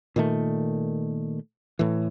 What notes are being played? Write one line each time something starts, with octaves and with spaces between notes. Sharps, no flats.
A#2 D#3 A3
A2 E3